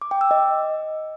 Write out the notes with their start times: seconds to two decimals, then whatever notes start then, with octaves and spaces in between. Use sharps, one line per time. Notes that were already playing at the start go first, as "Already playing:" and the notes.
0.02 D6
0.11 G5
0.21 E6
0.31 D#5